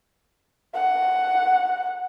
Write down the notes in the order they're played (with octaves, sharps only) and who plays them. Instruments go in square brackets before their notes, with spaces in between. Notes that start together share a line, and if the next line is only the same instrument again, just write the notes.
[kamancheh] F#5